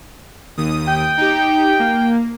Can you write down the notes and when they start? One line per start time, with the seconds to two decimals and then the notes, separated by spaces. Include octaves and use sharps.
0.57 D#2 D#6
0.88 G5
1.17 D#4 G4
1.79 A#3